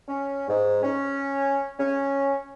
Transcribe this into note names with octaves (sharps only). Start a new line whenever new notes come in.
C#4
G#2
C#4
C#4